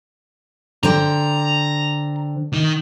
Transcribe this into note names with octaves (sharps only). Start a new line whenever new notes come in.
D3 C5 G5 A#5
D#3 D#4